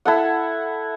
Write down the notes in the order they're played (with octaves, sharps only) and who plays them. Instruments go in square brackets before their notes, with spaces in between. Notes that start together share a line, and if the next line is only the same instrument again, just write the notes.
[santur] E4 A4 F#5